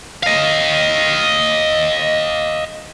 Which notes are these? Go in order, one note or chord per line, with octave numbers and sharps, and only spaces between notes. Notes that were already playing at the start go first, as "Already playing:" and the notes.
D#5 F5